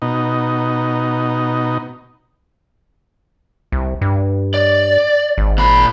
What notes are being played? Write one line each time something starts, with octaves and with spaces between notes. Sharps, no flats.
B2 D#4
C2
G2
D5
G#1
A#2 B5